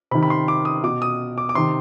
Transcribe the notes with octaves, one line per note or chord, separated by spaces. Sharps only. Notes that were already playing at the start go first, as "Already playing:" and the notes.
C3 D#3 B5
B5
C6
D6
D#6
B2 D6
D#6
D6
D6
C3 D#3 C6